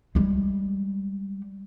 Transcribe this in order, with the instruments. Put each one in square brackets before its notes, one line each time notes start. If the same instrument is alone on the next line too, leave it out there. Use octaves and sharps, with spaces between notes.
[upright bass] G3 G#3